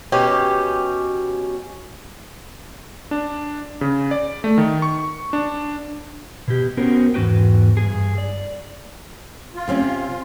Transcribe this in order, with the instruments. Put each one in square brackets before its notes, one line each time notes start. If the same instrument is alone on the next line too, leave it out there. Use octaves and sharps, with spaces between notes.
[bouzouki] B2 C#4 G4
[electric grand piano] D4
C#3
D5
A3
D#3
C#6
D4
[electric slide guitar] B2 G4
B3 C#4 F#4 A#4 C5 G5
E2 G#2 A#3 F#4 B4 G5
G2 G#4
D5
[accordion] F4
[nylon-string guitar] C3 C4 C#4